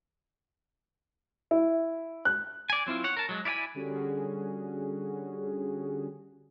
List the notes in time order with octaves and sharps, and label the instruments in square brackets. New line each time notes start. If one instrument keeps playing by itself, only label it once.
[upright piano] E4
F#6
[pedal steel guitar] D5 G#5
F#3 C4 E4 F4
C#5 F#5
A#4 A5
F#3 G#3
E4 D5 F5 G#5 B5
[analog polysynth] D3 G3 C#4 F#4 G#4